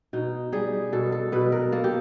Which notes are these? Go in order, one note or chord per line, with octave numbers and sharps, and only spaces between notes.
B2 D#4
G3 G#4
B2 A4
A4
B2 B4
A#4
A#3 A4
G4